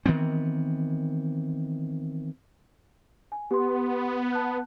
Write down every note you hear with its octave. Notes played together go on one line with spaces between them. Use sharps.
D#3 E3 B3 C4
G#5
B3 G4 C6
A5 F#6